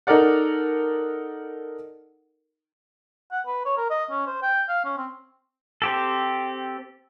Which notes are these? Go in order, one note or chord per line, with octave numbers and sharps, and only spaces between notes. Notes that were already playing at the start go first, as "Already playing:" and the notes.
D#4 A4 A#4 D5 F#5
F#5
B4
C#5
A#4
D#5
C#4
C5
G5
F5
C#4
C4
C4 G4 A4